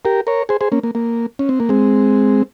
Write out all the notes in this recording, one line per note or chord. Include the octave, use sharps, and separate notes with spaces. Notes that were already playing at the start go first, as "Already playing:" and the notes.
G4 A#4
A#4 C#5
G#4 C5
G#4 C5
A#3 C#4
A#3
A#3
C#4
C4
A#3
G#3 C4